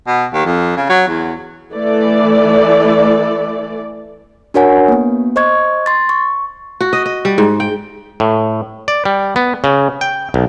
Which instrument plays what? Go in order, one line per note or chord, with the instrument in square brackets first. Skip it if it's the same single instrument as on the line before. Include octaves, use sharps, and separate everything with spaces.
[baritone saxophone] B2
D#2
F2
C#3
F#3
E2
[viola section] E3 A3 D5
[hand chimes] D4 F#4 A#4 C#5 F#5 G#5
A#3 B3
C5 D#5 C#6 G#6
C6 A6
C#6
[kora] F#4
D#5
D#5
G3
G#2
G5
[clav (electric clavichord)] A2
D5
G3
B3
C#3
G5
B1